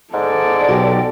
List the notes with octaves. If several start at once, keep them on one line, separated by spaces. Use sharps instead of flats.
G#2 A4 D5
B1 F#4 G4